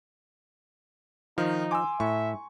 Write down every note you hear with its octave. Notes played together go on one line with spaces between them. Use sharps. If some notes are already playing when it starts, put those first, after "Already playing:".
D#3 F3 D#4
G#5 C6 D6 E6
A2 E5 C#6